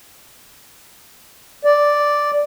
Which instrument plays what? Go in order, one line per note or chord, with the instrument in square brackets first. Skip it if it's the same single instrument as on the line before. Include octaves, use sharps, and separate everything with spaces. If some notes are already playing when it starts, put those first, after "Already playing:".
[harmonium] D5